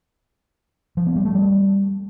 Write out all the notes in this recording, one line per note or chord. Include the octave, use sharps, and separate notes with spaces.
F3
B3
G3
A3
G3